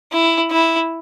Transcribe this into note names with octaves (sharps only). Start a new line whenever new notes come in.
E4
E4